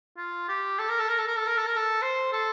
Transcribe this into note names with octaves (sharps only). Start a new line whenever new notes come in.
F4
G4
A4
A#4
A4
A#4
A4
A#4
A4
A#4
A4
A#4
A4
C5
A4